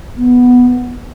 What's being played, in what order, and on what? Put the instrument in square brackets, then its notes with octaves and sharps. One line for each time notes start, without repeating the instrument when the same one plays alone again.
[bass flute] B3